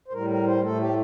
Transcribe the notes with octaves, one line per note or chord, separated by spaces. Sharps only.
C5
A2 G3 A#4
A#4
C5
A2 A3 A4
G4